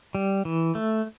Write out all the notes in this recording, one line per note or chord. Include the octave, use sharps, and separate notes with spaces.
G3
E3
A3